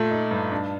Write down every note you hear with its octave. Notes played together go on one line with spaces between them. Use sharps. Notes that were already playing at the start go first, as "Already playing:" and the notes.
Already playing: A#2 A3
D#4
G2
D4